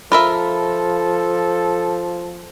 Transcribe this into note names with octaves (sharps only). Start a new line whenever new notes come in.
F3 F4 A4 A#4 E5 B5